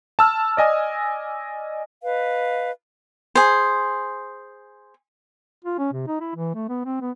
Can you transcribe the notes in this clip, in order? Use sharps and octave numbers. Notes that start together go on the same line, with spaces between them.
A5 E6 F6
D5 D#5 G#5 D#6
B4 D#5 F5
G#4 C5
F4
C#4
C3
D#4
E4
E3
A3
B3
C4
B3